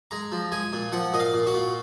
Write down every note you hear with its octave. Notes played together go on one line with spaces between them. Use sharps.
G#3 A#5
F3
G#3 G#5
A#2
F3 F#5
A#2 D#5
F5
A#2
F#4
A#2